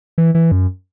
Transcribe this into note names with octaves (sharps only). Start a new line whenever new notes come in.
E3
E3
F#2